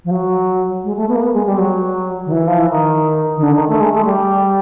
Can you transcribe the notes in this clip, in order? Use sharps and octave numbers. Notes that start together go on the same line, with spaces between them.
F3
F#3
G#3
A3
B3
A#3
B3
G#3
G3
F#3
D#3
E3
F3
E3
D#3
D#3
D3
D#3
A3
G#3
A3
G3